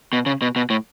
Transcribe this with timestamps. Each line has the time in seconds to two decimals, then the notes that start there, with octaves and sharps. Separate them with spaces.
0.13 B2
0.26 C#3
0.42 B2
0.56 B2
0.70 A2